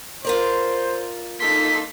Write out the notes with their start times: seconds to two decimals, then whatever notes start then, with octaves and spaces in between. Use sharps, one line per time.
0.25 F4 A#4 C5 D5
1.40 A#3 D#4 A4 C6 B6